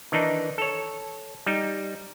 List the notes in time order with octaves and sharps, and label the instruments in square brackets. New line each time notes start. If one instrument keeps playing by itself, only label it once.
[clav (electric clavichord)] D#3 E3 D4 D#4
A4 C#5
G3 D#4